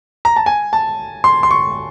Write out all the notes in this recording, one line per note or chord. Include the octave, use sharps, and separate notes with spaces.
A#5
A5
G#5
A5
C6
C6
C#6